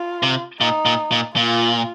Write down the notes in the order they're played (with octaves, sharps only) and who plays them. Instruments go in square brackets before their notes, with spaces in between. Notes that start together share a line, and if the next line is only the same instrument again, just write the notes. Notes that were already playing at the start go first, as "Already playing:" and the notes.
Already playing: [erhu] F4
[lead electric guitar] C3
[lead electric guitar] A#2 [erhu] D#4
[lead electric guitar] A#2
A#2
[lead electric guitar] A#2 [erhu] F4